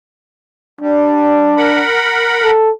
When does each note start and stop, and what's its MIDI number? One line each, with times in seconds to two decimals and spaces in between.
0.81 1.56 55
0.81 1.83 62
1.57 2.51 70
1.57 2.51 78
1.57 2.51 83
2.43 2.71 69